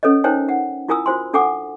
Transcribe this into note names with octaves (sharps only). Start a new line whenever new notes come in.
C#4 A4 B4 C#5 D#5
D#4 A#4 C5 C#5 G5 G#5
F#5
E4 F4 A#4 G#5 D#6 E6
F4 F#4 C5 G#5 C6
D4 A4 F#5 G#5 D6